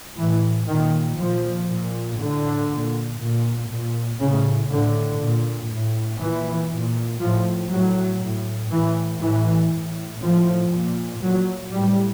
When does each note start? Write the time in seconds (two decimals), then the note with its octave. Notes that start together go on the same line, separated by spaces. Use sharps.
0.18 A2 E3
0.68 A#2 D#3
1.19 A#2 F3
1.69 A#2
2.19 A2 D3
2.69 A#2
3.19 A#2
3.70 A#2
4.20 A2 C#3
4.70 A2 D3
5.20 A#2
5.70 A2
6.20 A#2 E3
6.70 A#2
7.21 A2 F3
7.71 A2 F#3
8.22 A2
8.71 A2 E3
9.22 A2 E3
9.72 A2
10.22 A2 F3
10.72 A#2
11.22 A#2 F#3
11.73 A2 G3